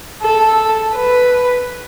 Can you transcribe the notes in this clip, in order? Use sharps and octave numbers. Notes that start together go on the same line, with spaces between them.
A4
B4